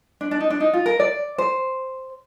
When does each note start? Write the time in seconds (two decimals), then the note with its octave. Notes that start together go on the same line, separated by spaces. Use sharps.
0.21 D4
0.31 D4
0.40 D#4
0.50 D4
0.60 D#4
0.74 F4
0.86 A#4
1.00 D5
1.38 C5